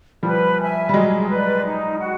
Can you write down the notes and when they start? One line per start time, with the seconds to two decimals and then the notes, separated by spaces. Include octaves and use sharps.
0.23 F3 G3 B4
0.58 E5 G#5
0.89 G3
0.94 F#3 G#3 G#4
1.30 B4 D5
1.65 D#4
2.00 F#4